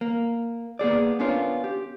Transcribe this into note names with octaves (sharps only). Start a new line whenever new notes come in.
A#3
A#3 B3 G#4 D5
B3 C#4 D4 F4 A#4 C#5
G4